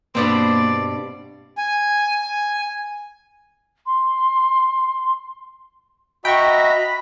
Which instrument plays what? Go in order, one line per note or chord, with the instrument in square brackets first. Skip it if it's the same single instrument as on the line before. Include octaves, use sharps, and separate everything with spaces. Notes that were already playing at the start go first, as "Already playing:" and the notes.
[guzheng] G2 B2 C4 [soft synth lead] A#3 [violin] D5
[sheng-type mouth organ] G#5
[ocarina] C6
[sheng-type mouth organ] F#4 E5 A#5 [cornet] D#5 [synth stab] G5 C#6 [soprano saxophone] B5